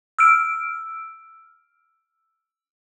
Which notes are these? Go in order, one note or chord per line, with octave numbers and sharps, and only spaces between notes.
E6 F6 D7